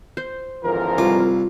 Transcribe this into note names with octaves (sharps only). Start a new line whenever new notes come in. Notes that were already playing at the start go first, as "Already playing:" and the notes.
C5
G#1 D3 E3 F3 G#4 A#4
C2 F4 D6